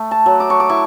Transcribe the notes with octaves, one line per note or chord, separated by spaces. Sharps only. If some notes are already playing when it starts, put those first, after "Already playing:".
Already playing: A3
A5
F#3
D6
C#6
D6
E4 C#6